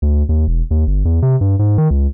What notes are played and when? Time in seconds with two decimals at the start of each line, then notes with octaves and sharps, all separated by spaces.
0.02 D2
0.29 D#2
0.48 E1
0.71 D#2
0.87 G1
1.05 E2
1.22 C3
1.41 G2
1.59 G#2
1.78 D#3
1.90 C#2